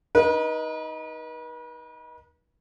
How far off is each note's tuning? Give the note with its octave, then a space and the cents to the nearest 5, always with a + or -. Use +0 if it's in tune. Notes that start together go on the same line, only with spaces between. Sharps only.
D#4 +10 B4 -40